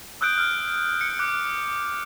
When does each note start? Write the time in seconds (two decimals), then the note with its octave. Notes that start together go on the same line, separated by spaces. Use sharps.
0.21 D#6 E6 F#6 G6 D7
0.38 F6
1.01 C#7
1.19 D6 F#6